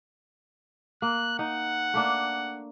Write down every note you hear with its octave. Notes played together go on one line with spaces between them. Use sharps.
A#3 F#6
D#4 F#5
A3 A#3 D4